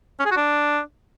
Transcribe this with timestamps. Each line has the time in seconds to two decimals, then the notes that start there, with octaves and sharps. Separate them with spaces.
0.20 C#4
0.25 G#4
0.31 F#4
0.37 D4